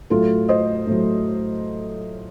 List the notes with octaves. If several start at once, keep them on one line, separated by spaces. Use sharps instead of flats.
A2 F#3 F4 A4
C5 D#5
A2 F#3